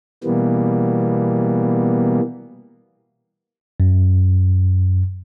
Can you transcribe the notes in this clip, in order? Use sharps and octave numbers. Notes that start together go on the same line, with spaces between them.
B2 E3 G3 A#3 B3
F#2